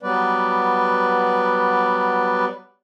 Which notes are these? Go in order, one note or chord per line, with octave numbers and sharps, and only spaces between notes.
F#3 G3 B3 B4 D5